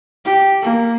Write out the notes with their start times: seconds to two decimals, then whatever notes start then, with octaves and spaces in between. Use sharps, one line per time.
0.25 G4
0.62 A#3